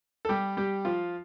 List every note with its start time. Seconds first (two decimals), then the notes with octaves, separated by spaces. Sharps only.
0.25 A4
0.29 G3 G4
0.57 G3 G4
0.85 F3 F4